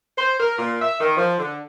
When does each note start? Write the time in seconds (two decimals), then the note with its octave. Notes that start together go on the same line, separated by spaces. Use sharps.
0.18 C5
0.40 A#4
0.58 A#2
0.82 E5
1.01 D#3
1.17 F3
1.39 D3